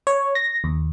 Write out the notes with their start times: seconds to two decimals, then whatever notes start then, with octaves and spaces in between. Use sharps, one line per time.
0.07 C#5
0.35 A#6
0.64 D#2